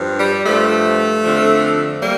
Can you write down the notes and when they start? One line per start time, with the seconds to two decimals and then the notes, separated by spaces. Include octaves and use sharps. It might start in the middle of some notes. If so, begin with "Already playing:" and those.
Already playing: G2 F3
0.19 G3
0.45 G2 F3 A3
1.23 F2 D3 F3
2.02 G3 A#3